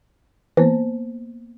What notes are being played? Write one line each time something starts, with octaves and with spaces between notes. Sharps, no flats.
E3 A#3 B3 C5